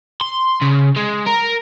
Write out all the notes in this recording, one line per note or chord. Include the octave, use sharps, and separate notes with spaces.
C6
C#3
G#3
A#4